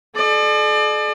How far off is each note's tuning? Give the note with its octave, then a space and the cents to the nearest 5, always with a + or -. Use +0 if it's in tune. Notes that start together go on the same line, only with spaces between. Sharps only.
A4 -45 D5 +35